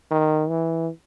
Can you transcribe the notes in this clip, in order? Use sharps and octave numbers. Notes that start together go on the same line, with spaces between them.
D#3
E3